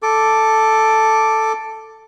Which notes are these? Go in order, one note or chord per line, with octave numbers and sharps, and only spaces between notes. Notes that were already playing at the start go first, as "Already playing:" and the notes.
A4 D6